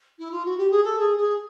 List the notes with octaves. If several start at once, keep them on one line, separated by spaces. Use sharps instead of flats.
E4
F4
F#4
G4
G#4
A4
G#4
G#4